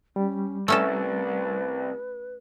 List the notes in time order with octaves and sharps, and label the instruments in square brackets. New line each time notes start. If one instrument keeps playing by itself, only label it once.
[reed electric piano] G3 [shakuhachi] C#4
[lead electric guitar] C2 [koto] A3 C#4 A4 [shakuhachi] B4